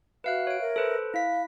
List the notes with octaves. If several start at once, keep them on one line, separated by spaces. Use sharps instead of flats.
F#4 B4 E5 F5 F#6
C#5 D7
A#4 E5
A4 B4 C5
E4 F5 B6